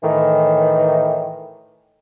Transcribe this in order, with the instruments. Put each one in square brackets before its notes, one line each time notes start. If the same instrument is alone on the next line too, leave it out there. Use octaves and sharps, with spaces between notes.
[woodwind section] A2 D#3 E3